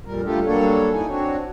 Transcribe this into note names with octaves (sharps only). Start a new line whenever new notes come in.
F2 A#2 G3 A#4
G3 A3 D4 F4 G4 A4
F#3 G3 A#3 D4 A4 C#5
D#4 E4 G#5
C4 D4 F#4 C#5